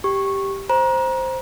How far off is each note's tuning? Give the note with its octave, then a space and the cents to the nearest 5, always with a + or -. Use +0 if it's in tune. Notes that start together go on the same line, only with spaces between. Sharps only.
G4 +0 C#6 -10
C5 +0 A#5 +30